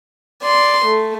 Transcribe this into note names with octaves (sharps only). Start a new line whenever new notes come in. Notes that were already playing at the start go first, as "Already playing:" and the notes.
D5 C6
A3